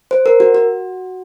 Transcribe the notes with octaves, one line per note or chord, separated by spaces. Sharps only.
C5
A#4
F#4
F#4